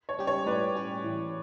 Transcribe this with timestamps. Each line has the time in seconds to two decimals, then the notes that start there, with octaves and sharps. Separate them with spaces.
0.09 C#5
0.19 G3 C#4 G4
0.27 C#5
0.46 A2 B4 D5
0.75 G3 C#4 G4
1.04 E3